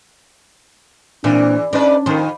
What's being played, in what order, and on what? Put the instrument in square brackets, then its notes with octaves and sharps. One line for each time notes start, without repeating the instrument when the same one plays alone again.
[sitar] E2 E3 [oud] A#2 C4 E4 [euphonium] D4
[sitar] G#2 B4 D5 [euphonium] C#4 [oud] D4
[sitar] F2 [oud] D#3 C5